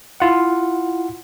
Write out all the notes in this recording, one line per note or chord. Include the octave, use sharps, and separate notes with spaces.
E4 F4 F#5